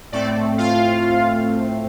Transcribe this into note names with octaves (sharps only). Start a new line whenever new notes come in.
A2 A3 C4 D5
F4 F5